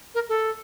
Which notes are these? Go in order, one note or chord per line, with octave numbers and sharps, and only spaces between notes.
A#4
A4